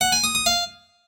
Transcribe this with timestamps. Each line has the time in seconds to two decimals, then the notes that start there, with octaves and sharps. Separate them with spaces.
0.01 F#5
0.12 G#5
0.24 D#6
0.35 D#6
0.46 F5